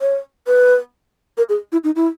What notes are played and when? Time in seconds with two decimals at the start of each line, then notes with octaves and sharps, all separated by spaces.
0.01 C#5
0.47 B4
1.38 A#4
1.49 G#4
1.72 E4
1.84 D#4
1.96 E4